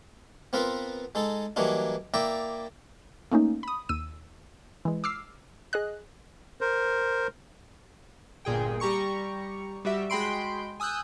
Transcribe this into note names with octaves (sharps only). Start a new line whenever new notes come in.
B3 C4 F4 A#4 B4 F5
G#3 D#4 A4
E3 F#3 G3 A#3 D4 D#4
A#3 E4 D5 E5 G5 A#5
A3 A#3 C#4 D#4
B5 D#6
D#2 E6 D#7
E3 G#3
D6 E6 F6 C7
G#4 D#5 F#6
A#4 C5
G1 A#2 G#4 G5
G3 G4 A#5 C#6 C#7
G3 F#4 G4 E5
G#3 F#4 G5 B5 C6 D7
G#5 D#6 E6 F#6 G6